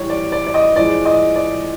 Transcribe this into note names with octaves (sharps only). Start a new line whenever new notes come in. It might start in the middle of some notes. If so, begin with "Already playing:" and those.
Already playing: A2 E3 G3 C#5
D5
D5
D5
D#5
A2 F3 G#3 D5
D#5
D5